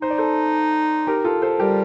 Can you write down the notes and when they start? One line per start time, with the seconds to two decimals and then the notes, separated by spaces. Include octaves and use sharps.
0.02 D#4 C5
0.10 D5
0.18 A4 C5
1.07 G4 A#4
1.24 F4 A4
1.42 A4 C5
1.60 G3 G4 A#4